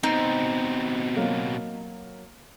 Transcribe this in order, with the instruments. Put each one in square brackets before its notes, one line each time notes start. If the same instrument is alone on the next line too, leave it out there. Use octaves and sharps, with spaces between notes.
[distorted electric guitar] B2 C4 [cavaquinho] D#4
[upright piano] F#3 A#3